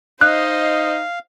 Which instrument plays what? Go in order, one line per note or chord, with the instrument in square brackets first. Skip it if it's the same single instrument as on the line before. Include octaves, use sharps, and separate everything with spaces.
[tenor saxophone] D#4 [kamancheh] C5 D#5 [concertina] F5 [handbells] F#6